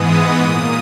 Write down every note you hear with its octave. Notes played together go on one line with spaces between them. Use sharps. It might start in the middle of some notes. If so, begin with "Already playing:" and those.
Already playing: G#2 E3 G#3 B3 D#6
A#2 A#3